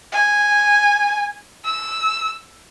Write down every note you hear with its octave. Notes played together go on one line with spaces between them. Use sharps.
G#5
E6